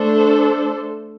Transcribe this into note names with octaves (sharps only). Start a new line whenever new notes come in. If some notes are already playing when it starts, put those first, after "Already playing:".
Already playing: A3 D4 A4 C5